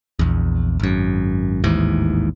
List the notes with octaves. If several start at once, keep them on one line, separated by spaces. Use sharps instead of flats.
A#1 E2
G#1 F#2
A1 D#2 G#2 E3